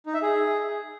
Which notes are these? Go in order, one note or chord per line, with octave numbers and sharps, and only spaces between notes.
D#4
E5
G#4